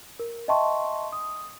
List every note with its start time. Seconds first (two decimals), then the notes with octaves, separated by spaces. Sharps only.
0.19 A#4
0.48 D#5 E5 G5 A5 C6 C#6
1.12 D#6